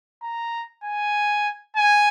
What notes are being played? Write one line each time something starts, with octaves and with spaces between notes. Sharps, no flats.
A#5
G#5
G#5